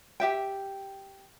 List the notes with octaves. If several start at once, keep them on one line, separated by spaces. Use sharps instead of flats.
G4 E5 G5